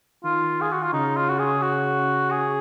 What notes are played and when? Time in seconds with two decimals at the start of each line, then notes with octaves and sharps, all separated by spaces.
0.24 D#3 F4
0.61 G#4
0.71 F#4
0.82 F4
0.93 C#3 D#4
1.16 F4
1.29 F#4
1.39 G#4
1.62 F#4
2.31 G#4